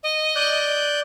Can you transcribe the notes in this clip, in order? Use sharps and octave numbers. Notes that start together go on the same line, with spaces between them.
D#5
D5 F#6 G6